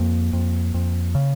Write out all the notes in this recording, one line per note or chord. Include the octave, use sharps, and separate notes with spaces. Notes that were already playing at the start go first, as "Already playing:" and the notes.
Already playing: F2 A#3
F2
F2
C#3